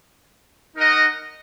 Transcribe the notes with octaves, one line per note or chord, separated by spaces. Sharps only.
D#4 A#4 D#5 F#5